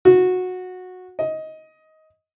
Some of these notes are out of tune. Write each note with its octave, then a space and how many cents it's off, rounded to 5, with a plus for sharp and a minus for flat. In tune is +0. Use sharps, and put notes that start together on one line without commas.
F#4 -15
D#5 +15